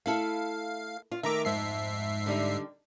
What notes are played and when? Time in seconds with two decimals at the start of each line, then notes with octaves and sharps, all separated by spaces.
0.06 A3 E4 A4 F5
1.11 F4
1.23 D#3 A3 E5 A#5 D6
1.45 F2 G#2 E5 C7
2.26 D3 G3 D#4